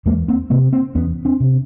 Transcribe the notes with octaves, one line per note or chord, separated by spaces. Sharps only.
E2 G#3 A#3
A#3 C4
C3 A#3 C4
A#3 C4
E2 B3 C#4
C4 D4
C3